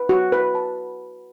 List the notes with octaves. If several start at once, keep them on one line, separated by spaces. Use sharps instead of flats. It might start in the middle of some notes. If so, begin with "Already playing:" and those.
Already playing: B4
F#4
B4
A5